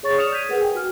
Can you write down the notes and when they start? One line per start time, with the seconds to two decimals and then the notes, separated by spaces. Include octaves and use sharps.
0.03 G#4 C#5 C#6 A6
0.17 D5 D#6 F6 C#7 E7 F7
0.32 G6 G#6 B6 D#7
0.49 G#4 A#4 B4 F#5
0.61 G5 G#5
0.75 F#4 F6